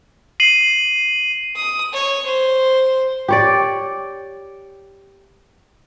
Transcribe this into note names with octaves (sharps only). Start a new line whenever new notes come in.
C7 D#7 F#7
D#6
C#5
C5
G4 C#5 D5